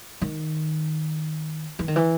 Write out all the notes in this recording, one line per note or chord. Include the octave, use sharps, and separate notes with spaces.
D#3
E3
D#3
E3